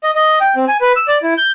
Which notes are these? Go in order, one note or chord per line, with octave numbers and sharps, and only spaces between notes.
D#5
D#5
G5
C4
G#5
B4
E6
D5
E4
G6